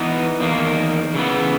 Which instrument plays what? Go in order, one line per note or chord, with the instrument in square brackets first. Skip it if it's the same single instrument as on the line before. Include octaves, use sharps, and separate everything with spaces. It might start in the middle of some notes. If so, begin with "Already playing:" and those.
Already playing: [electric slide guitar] E3 B3 D#4
E2 D#3 A#3
C#3 E3 B3